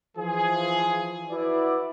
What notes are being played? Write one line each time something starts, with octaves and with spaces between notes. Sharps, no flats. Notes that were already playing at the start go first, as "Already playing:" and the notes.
E3 F3 G#4
E4 F#4 B4 D5